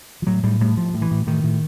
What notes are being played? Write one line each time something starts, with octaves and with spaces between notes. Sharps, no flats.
F3
A2 F#3
A2 G3
A2 G3
A2 F3
A2
E3
A2
A2 D#3
A2